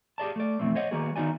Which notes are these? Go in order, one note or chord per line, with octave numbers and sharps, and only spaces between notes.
G4 G#4 D5 A5
A3 D5
F2 B2 D#3 E3 A3 C4
C5 C#5 D#5 F#5
D#3 G3 A#3 B3 F#4 G#4
D#3 B3 D#4 F#4 D5 G#5